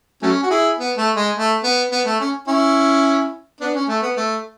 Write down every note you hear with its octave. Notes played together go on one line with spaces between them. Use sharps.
F#3 A3 C#4
F#4
E4 G#4
B3
A3
G#3
A3
B3
B3
A3
C#4
C#4 E4
B3 D4
C#4
A3
B3
A3